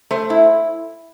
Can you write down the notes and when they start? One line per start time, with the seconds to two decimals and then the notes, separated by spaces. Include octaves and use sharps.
0.11 A3 C5
0.30 E4